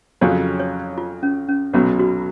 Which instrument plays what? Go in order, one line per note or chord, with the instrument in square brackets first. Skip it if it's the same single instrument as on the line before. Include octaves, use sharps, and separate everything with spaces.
[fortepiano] F2 C#3 F#3 C#4 [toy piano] C#5
[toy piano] C#5
F4
C#4
C#4
[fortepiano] B1 B2 F#3 [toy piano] C#4
[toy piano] F#4